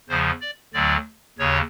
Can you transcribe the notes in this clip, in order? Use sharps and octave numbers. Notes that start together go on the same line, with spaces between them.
E2 C#3 F3 C5
D5
D2 D3 F#3 D5
D#2 C#3 C#5